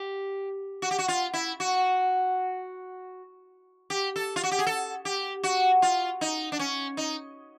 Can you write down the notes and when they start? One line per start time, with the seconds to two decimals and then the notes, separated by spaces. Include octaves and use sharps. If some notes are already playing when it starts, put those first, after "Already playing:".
Already playing: G4
0.82 F#4
0.91 G4
0.99 F#4
1.08 F4
1.34 E4
1.60 F#4
3.90 G4
4.16 A4
4.36 F4
4.44 F#4
4.51 G4
4.59 G#4
4.67 A4
5.05 G4
5.44 F#4
5.82 F4
6.21 D#4
6.52 D4
6.59 C#4
6.97 D#4